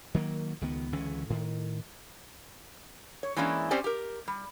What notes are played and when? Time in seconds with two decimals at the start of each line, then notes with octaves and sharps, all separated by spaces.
0.14 D#3 F#3 A#3
0.61 C#2 D#3 B3
0.92 C#2 D3 E3 C#4
1.30 A2 D#3
3.23 C#5
3.36 E3 G#3 A#3 C#4 D4 E4
3.71 C4 C#4 G4 C5 D5 G#5
3.84 G4 A#4
4.28 G3